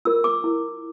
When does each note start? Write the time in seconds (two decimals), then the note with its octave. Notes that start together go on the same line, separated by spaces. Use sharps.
0.05 F4 A#4 E6
0.24 D6
0.44 E4 A#4